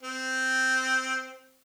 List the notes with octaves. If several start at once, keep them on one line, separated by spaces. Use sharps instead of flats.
C4